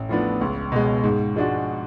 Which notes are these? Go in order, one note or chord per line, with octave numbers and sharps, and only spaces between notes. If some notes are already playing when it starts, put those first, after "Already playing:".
Already playing: A1
A2 F3 B3 D4
C#2
B2 G#3
G#2
F3 G#3 D4 F#4